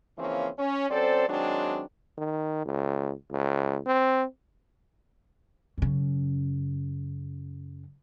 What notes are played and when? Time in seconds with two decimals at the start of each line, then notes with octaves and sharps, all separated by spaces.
0.18 C#3 E3 F3 A#3 C4 C#4
0.58 C#4
0.90 F#3 C4 C#4 A4 C5 D5
1.29 D#3 F#3 G#3 C4 D4
2.17 D#3
2.65 C#2
3.31 C#2
3.86 C4
5.78 F#2 C#3